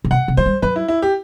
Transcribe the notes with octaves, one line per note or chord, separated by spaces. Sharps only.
C3
B2 F#5
C3
F#3 C5
G3
F#3 B4
E4
E4
G4